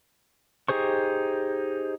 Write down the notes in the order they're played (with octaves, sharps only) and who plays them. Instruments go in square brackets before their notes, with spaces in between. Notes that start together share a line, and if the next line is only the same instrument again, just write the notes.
[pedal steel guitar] D#4 G4 G#4 C5 C#6